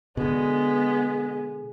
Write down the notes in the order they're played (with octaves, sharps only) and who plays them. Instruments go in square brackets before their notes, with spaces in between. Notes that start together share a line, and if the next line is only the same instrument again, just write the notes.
[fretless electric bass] B2 D3 [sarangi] G#3 [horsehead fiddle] B3